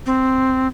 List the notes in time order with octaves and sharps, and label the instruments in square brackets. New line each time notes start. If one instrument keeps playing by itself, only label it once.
[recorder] C4